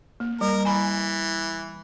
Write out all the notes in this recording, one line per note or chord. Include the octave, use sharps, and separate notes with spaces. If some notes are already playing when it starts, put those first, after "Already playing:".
A#3
G3 A#4
E3 G#5 B5